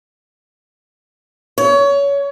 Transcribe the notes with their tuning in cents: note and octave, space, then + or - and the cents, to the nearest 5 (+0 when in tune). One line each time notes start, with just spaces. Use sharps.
C#5 +25